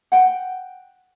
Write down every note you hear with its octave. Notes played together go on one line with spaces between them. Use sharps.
F#5 G5